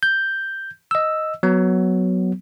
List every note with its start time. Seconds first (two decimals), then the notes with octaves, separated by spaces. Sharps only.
0.03 G6
0.91 D#5 E6
1.43 F#3 B3